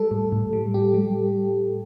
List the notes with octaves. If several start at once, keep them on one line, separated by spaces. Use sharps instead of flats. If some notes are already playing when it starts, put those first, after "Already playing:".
Already playing: G3 A4
A2
A2
G3
G3 G4
G3